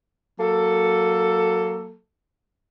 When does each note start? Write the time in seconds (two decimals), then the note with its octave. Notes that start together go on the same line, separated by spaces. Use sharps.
0.40 F#3 A#3 A4